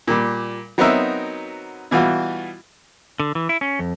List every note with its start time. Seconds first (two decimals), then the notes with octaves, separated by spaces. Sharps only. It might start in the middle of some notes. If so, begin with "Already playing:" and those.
0.08 A#2 G3
0.78 F#3 B3 C4 D#4 A#4 E5
1.91 B2 E3 G3 F4 F#4
3.20 D3
3.35 E3
3.49 E4
3.61 C#4
3.79 F2